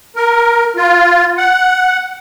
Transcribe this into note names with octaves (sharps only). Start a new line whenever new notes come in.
A#4
F4
F#5